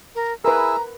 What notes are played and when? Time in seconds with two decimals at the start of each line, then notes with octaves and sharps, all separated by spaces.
0.15 A#4
0.45 E4 G#4 A#4 B4 A#5 E6